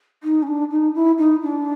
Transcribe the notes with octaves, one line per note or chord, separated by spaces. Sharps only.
D#4
C#4
D4
D#4
E4
D#4
D4